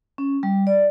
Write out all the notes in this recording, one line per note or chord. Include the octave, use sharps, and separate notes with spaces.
C#4
G3
D5